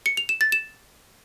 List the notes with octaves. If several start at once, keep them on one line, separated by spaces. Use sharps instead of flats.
C#7
F7
E7
A6
E7